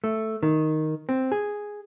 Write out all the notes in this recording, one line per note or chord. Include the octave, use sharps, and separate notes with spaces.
A3
D#3
C4
G#4